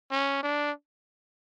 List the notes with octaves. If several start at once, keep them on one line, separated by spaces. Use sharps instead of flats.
C#4
D4